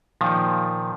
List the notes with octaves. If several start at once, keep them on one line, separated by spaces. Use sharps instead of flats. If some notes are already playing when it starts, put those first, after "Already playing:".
A#2 D#3 F3